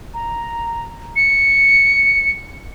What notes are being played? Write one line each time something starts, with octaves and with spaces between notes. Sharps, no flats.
A#5
C#7